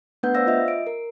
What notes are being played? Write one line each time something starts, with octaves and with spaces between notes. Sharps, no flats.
A3 B3 D4 B4 F#5 G6
C5 D5 F5 E6 A#6
F4 D#5 E5
D7
A#4